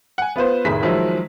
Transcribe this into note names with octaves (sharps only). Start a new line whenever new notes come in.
F#5 G#5
B3 F4 B4 C5
F1 A2 D#3 G#4 A#5 B6
D#3 F3 F#3 G#3 E4